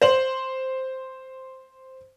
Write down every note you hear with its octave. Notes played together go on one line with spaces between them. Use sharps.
C5 F#7